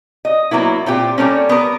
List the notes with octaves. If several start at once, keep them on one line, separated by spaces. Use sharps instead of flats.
D#5
F#3 A#3 B3 E4
A#2 C4 F4 G4
G3 A3 A#3 C#4
B3 A#4